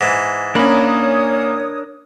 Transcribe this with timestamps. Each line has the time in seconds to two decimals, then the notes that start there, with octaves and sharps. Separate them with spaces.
0.01 G#2 E3
0.55 A#3 C#4 D4 A#4 C#5 B5 D#6